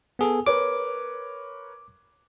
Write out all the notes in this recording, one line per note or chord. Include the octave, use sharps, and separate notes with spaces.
B3 G#4 A4
A#4 B4 C#5 D6